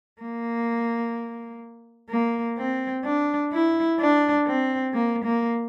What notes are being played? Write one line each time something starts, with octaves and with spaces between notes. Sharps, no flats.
A#3
A#3
C4
D4
E4
D4
C4
A#3
A#3